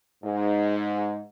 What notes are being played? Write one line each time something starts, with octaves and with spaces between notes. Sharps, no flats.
G#2